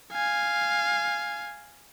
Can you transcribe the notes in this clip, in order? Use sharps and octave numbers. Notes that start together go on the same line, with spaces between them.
F5 G#5